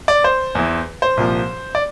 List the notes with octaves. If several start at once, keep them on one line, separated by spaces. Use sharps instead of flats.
D5
C5
E2 E3
C5
C2 A#2 F3
D5